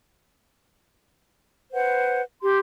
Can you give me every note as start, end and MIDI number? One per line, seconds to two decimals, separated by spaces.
1.73 2.21 71
1.73 2.21 72
1.73 2.21 78
2.42 2.59 67
2.42 2.59 84